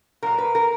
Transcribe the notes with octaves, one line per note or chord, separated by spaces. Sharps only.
A#2 F#3 A#3 A#4
B4
A#4